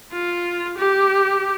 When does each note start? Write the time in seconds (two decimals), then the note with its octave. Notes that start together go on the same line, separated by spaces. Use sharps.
0.13 F4
0.78 G4